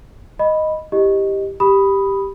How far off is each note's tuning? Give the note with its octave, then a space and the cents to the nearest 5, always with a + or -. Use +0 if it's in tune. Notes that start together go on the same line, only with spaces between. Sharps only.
D#5 +0 B5 +0
E4 +0 G4 +5 D#5 -5
G4 +0 B5 +0 D#6 +0